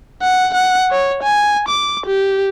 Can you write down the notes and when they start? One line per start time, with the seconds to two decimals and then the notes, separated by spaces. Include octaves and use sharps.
0.22 F#5
0.54 F#5
0.91 C#5
1.23 G#5
1.68 D6
2.06 G4